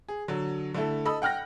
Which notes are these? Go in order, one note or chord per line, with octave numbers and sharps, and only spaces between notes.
G#4
D3 F#3
D3 A3 E4 A4
A4 D#5 B5 D#6 E6
F#5 G5 F6 F#6 A#6